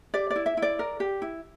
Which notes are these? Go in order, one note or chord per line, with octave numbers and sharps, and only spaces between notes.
G4 D5
D5
E4
E5
E4
D5
A#4
G4
E4